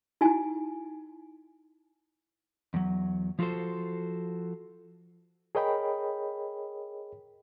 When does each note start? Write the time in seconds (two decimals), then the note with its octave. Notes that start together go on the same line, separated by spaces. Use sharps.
0.21 D#4 E4 F#4 G#5
2.74 E2 F#3
3.39 F3 F4 F#4 A4 C5
5.55 G#4 A#4 C#5 D#5 G5 B5